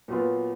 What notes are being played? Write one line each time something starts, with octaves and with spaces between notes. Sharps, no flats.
A#2 F#3 B3 F4